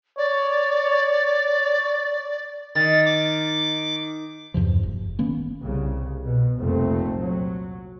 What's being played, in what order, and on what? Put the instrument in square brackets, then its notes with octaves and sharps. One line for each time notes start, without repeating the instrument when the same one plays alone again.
[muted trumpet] C#5 [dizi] D5
[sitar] D#3 [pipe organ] A6
[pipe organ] D6
[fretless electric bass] E2 G2 C3 F3
F#1
D#3 A#3 B3 C#4
[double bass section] C2 C#3
B2
F1 C2 A#2 A3 C4
F#3